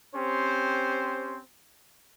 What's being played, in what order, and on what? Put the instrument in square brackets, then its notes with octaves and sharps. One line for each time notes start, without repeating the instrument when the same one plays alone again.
[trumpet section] C4 C#4 G4 C5